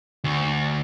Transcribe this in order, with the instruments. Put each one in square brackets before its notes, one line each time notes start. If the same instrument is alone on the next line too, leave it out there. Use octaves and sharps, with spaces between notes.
[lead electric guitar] D2